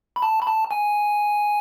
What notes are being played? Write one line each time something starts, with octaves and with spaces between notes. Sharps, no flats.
B5
A5
B5
A5
G#5